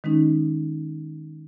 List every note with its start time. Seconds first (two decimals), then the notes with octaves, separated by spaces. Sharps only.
0.04 D#3 G#3 C#4 D#4